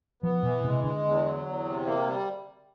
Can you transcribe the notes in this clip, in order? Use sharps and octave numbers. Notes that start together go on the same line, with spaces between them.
F3 B3
B2 E3
C3 G#3
D3 G#3
E2
F#3
E2
C3
A#3
G3